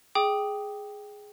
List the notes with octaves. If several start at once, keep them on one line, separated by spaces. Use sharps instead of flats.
G#4 G5 D6 D#6